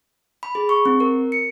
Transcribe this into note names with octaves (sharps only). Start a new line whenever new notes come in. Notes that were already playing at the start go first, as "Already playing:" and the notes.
B5
G#4
C#6
C4
A#4
C#7